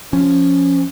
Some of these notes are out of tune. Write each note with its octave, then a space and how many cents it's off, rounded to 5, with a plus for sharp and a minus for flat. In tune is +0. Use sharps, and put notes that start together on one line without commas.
F3 +0 C#4 +0